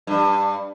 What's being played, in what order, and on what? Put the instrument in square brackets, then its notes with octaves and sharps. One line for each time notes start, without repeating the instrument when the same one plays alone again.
[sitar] G2